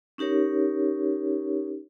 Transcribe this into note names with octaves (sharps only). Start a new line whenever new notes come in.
C#4 D#4 G4 A#4 C#5